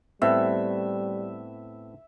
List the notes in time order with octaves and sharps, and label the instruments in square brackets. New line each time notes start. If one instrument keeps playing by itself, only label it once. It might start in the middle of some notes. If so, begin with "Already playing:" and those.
[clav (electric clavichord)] A2 B3 C4 [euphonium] G3 [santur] E5